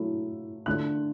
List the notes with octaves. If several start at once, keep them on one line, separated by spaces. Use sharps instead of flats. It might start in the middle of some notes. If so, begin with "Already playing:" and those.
Already playing: F#3 A3 E4
D3 A3 D4 F#6